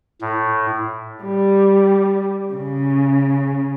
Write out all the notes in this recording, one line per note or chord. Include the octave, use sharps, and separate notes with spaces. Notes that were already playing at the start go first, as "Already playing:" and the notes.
A2
G3
C#3